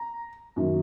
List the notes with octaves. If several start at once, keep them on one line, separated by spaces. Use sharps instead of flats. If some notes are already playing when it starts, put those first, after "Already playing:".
Already playing: A#5
F#2 D#3 F#3 A#3